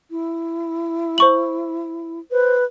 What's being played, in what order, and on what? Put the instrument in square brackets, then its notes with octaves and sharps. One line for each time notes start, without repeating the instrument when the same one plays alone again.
[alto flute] E4
[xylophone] C5 C#6 F#7
[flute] B4 [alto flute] C5